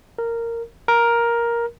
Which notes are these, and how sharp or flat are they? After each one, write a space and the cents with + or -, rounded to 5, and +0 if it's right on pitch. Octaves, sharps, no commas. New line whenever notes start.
A#4 -10
A#4 +10